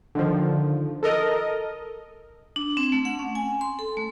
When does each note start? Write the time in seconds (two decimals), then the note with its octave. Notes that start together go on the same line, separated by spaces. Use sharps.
0.15 D3 D#3 F3
1.03 A4 A#4 D#5
2.56 D4
2.77 C4
2.92 A3
3.05 F#5
3.19 C#4
3.35 G#5
3.61 C6
3.79 A4
3.97 A3